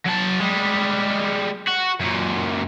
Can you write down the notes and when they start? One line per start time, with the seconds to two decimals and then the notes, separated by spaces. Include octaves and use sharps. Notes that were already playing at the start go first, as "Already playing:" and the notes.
0.06 F#3 A5
0.41 G3 G#3
1.67 F#4
2.00 F#2 A#2